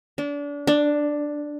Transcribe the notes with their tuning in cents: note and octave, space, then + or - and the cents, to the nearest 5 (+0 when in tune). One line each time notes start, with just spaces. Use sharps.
D4 -30
D4 +5